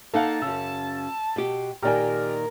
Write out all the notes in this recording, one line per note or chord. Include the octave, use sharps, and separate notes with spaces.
A#3 D#4 A4 F5 F#5 A5
F#2 C#3 E6
B2 G4
A#2 D#3 G4 A#4 D5 G#5